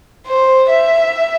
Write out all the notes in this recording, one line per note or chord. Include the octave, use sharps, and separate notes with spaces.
C5
E5